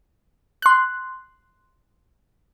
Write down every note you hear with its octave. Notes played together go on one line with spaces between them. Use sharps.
C6 F#6